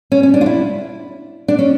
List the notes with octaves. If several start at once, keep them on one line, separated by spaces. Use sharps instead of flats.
C#4
C#4
D4
F4
E4
D4
C#4